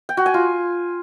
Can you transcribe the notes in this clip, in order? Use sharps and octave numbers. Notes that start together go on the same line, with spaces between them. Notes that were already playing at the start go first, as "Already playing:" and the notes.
G5
F#4
G#5
F4